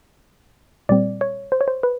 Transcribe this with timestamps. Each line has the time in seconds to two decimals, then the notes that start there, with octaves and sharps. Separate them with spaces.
0.89 A#2 G3 C4 D5
1.21 C#5
1.52 C5
1.61 C#5
1.68 C5
1.83 B4